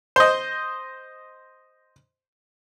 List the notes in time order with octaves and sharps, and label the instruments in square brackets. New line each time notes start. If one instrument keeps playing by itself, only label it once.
[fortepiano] C5 D#5